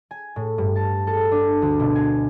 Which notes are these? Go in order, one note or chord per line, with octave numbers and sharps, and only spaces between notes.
G#5
A2
G2
A5
A4
D4
D2
B2
G#5